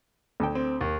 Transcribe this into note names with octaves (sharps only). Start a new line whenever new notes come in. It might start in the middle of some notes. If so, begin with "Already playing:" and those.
D2 A4 G5
C4
D#2